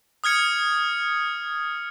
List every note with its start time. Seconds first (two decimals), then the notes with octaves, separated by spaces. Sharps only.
0.24 D#6 F6 G#6 C#7